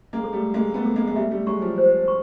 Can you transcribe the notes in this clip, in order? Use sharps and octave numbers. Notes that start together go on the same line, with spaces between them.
G#3 A#3
A4
G3 A3
G#3 A#3 F5
A3 B3
A4
G#3 A#3
G#3
G3 A3 E5
G3 A3
F#3 G#3 C#6
F3 G3
C5
C#6